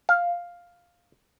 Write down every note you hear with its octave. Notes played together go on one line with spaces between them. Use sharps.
F5